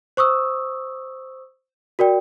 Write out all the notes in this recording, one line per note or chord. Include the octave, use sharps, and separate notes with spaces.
C5 C#6 D#6 E6
F#4 A#4 D5 G5